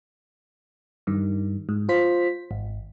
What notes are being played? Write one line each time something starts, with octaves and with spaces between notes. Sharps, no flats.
G2 D#3
G#2
F4 C5 B6
G#1